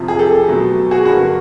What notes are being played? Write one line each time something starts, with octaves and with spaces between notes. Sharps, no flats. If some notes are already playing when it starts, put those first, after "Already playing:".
Already playing: F2 C3 F3
G#4
G4 A4
B2 F#3 A3
F#4 G#4
G2 D3 F#3 A#3 F#4